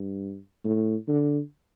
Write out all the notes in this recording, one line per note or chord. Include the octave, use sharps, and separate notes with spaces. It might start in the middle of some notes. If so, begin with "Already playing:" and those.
Already playing: G2
A2
D3